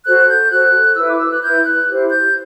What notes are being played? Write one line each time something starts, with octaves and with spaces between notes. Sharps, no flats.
F#4 A4 C5 F#6
G6
F#4 A4 C5 F#6
E4 B4 E6
D6
E6
F#6
E4 B4 G6
F#6
E4 G4 C5
G6